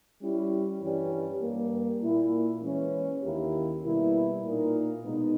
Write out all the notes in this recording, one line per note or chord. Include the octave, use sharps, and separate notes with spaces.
G3 C#4 E4
G2 E3 G3 C#4 G4
G2 G3 A#3
A#2 A#3 E4
E3 G#3 C#4
D#2 D#3 A#3 E4 G4
B2 G3 A#3 E4
A#2 A#3 D#4 A#4
B2 G#3 B3 D#4